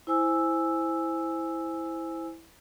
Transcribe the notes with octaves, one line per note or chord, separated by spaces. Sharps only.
E4 C5 G#5 E6